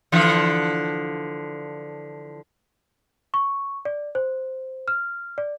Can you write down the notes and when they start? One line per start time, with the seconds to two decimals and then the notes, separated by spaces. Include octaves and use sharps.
0.12 D3 E3 F3
3.34 C#6
3.85 D5
4.15 C5
4.88 F6
5.38 D5